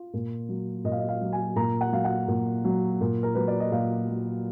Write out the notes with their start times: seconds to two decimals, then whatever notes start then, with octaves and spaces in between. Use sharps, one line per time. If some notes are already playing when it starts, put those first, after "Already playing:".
Already playing: F4
0.13 A#2
0.49 F#3
0.84 A#2 D#5
0.92 F5
0.99 D#5
1.09 F5
1.21 F#3
1.33 G#5
1.56 A#2 A#5
1.81 F#5
1.92 F#3 F5
2.04 F#5
2.28 A#2
2.64 F#3
3.01 A#2
3.23 A#4
3.35 F#3 B4
3.48 D5
3.60 D#5
3.72 A#2 F5
4.08 F#3